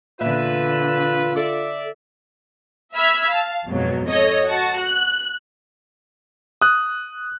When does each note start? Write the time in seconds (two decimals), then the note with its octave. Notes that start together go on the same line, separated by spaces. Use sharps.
0.21 E2 A#2 D3 F4 B4 E5 E6
1.36 A4 D5 E5
2.95 E5 B5 E6 F6 G#6 B6
3.29 F5 A5
3.66 F2 G#2 B2 F#3
4.09 A4 C#5 D#5
4.46 F#4 A5
4.76 F#6
6.62 D#6 F#6